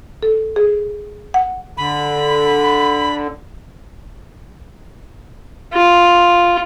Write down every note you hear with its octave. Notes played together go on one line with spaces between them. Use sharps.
A4
G#4
F#5
D3 B5
F4